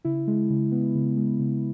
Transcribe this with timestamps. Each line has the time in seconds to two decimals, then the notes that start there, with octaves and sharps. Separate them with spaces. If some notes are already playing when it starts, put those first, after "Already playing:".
0.05 C#3 E4
0.27 G#3
0.50 C#3
0.72 B3
0.95 C#3
1.17 G#3
1.39 C#3